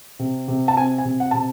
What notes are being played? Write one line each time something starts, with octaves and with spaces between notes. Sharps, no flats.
C3
C3
A5
C4 G#5
G#5
C3
F#5
C3 A5